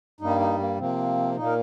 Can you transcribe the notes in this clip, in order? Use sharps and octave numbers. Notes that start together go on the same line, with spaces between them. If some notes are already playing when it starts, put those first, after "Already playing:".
G2 G3 A#3 D#4
D#4
A#3
C3 F3 A#3 C4
A#2 A#3 D#4
A#4